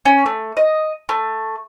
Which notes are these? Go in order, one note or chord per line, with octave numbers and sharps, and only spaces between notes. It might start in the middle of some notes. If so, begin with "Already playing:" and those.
C#4
A3
D#5
A3